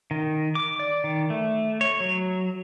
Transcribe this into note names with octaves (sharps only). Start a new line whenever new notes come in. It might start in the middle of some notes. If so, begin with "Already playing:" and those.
D#3
D6
D5
D#3
A3
C#5
F#3